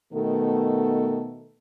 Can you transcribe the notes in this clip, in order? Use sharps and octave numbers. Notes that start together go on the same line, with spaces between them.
B2 D#3 A3 B3 A4